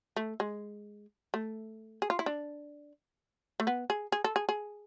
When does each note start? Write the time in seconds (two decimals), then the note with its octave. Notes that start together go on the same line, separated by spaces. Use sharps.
0.16 A3
0.40 G#3
1.34 A3
2.02 G#4
2.10 F4
2.19 E4
2.26 D4
3.60 A3
3.67 B3
3.90 G#4
4.12 G#4
4.24 A4
4.36 G#4
4.49 G#4